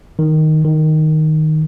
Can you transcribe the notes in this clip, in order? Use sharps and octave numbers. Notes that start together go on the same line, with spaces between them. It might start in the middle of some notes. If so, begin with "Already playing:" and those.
D#3
D#3